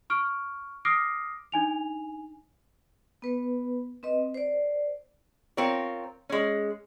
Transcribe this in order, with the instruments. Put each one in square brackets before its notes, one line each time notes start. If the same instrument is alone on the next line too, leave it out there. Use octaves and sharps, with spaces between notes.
[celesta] C#6 F6 D7
D6 D#6 F6 A#6 C7 D7
D4 D#4 G#5 F7
[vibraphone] B3 B4
C4 B4 D#5
C5 D5
[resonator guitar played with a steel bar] C4 F4 A#4 C#5
G#3 C#4